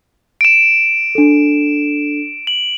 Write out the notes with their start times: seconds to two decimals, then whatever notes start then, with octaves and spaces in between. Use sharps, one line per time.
0.41 D7 E7
1.15 D4 A4
2.47 F#7